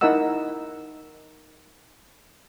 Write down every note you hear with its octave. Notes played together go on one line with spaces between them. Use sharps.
D#4 E4 A#4 D#5 F#5 E6